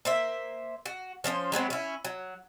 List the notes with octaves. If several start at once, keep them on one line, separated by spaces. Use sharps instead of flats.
A#3 C5 E5
F#4
F3 C#4 D4 C5
F#3 G#3 B3 C4
C#4 E4
F#3